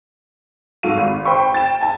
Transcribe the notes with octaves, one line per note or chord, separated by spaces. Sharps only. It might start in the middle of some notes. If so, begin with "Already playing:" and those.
G#2 F#4 A4 F5 D#7
G#1
C5 G5 B5 C#6
G5 A6 E7
G#5 A5